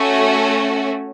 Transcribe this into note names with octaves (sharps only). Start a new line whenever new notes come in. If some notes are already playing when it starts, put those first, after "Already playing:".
Already playing: A3 C#4 F#4